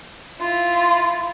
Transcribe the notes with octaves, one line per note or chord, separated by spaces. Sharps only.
E4 F4